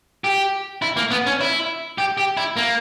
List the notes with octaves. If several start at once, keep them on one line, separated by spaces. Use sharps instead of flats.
G4
E4
A#3
B3
C#4
E4
G4
G4
E4
A#3